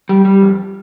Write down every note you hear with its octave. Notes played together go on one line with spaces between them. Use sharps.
G3
G3
F2